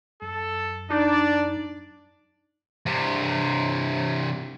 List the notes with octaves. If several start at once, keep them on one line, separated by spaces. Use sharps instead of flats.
F#2 A4
D4 D#4 D5
G2 C3